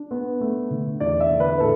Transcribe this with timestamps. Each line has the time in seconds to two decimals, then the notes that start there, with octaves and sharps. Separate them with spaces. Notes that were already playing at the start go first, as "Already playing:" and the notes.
Already playing: D4
0.11 B3
0.41 A3
0.71 D3
1.00 E2 D5
1.20 E5
1.31 D3
1.40 B4
1.60 A2 A4